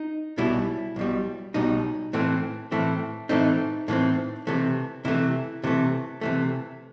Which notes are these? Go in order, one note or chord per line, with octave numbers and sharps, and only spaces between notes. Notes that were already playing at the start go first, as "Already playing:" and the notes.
Already playing: D#4
B1 B2 G3 E4
B1 B2 G3
B1 B2 G3 D#4
A2 E3 A3 C4
A2 E3 A3 C4
A2 E3 A3 C4 D#4
A2 E3 A3 C4
C3 E3 A3
C3 E3 A3 E4
C3 E3 A3
C3 E3 A3